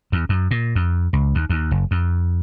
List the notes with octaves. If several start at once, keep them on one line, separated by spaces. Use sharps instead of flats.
E2
F#2
A#2
F2
C#2
D#2
D#2
F#1
F2